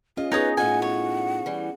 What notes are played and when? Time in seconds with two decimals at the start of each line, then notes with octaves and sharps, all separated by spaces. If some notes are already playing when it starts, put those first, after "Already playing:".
0.17 C#4 F4 G#4 D#5
0.32 B3 D#4 G#4 B4 C#5 D#6
0.57 A2 D#4 F4 F#5 G#5
0.82 C#5
1.46 E3 G3